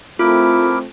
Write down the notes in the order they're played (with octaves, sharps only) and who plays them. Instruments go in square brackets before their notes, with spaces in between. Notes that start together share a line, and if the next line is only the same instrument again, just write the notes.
[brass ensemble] A3 C4 [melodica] E4 A#4 D6 [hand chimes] F4